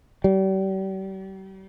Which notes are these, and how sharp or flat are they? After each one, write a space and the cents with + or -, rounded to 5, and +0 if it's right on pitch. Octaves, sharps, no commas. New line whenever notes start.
G3 -40